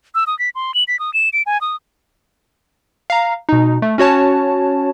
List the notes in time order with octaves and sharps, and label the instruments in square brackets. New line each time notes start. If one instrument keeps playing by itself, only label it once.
[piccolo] E6
D#6
B6
C6
F#7
B6
D#6
E7
D7
G#5
D#6
[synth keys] F5 A#5
B2 D#4
A3
C#4 F#4 C#5 A5